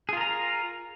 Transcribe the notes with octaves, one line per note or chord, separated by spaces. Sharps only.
F4 G#4 A#4 A#5